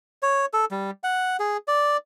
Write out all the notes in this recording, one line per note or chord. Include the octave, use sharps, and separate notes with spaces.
C#5
A4
G3
F#5
G#4
D5